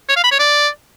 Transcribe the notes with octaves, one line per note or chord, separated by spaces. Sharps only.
C#5
F5
B5
C#5
D5